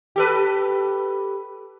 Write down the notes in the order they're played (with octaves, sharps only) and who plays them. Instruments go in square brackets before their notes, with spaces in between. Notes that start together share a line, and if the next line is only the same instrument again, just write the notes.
[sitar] G4 A4 B4